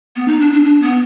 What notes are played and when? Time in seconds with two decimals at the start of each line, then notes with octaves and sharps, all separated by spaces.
0.16 B3
0.28 D#4
0.40 D4
0.53 D4
0.65 D4
0.82 B3